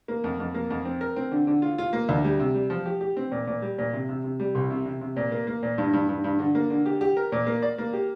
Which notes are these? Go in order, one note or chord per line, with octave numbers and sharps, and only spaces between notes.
A#3
F2
F2
A#3
F2
C4
A#4
C4
D3
D3
F4
F4
A#3
D2
G3
C3
G3
F3
G4
G4
C4
A#2
A#2
G3
A#2
C3
C3
C3
G3
C2
C3
C3
C3
A#2
A#3
A#3
A#2
G2
G2
G2
G2
D3
A#3
D3
G4
G4
A#4
A#2
A#3
D5
A#3
G4